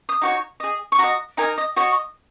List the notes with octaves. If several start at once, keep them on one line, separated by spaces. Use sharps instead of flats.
D#6
D#4 F#4 C#5
G#4 D#5
C#6
F#4 D#5 A#5
D#4 A#4 D#5 G#5
D#5
F#4 C#5 D#5